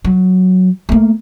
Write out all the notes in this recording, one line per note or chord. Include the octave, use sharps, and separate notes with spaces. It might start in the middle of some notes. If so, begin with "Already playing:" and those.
F#3
A3 A#3